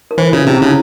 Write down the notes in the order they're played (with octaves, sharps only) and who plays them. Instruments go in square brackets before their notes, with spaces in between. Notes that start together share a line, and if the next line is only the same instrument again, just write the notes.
[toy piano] A#4
[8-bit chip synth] E3 [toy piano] C5
[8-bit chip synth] C#3 [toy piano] F4
[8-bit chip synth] C3 [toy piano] E4
[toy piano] C#4
[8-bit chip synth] C#3 [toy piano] E4